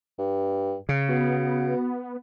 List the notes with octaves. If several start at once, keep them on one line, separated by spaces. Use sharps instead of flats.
G2
C#3
B3 F#4